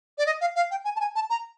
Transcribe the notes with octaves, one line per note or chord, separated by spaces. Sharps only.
D5
D#5
F5
F5
G5
G#5
A5
G#5
A5
A#5